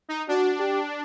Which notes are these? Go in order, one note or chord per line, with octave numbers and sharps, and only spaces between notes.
D#4
D4 F#4
G4